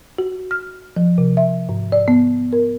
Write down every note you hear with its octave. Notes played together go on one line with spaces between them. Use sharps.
F#4
F6
F3
C3
E5
G#2
D5
B3
A#4